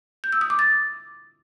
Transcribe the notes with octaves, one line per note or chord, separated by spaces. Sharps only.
G6
E6
D#6
D6
A6